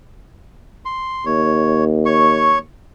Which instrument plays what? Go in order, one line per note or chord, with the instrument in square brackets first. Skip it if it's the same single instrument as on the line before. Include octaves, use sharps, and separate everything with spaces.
[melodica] C6
[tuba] D#2 [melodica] C#5
[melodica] C#5 C#6